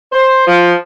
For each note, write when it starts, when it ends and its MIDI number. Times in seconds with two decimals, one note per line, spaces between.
0.13 0.46 72
0.48 0.75 53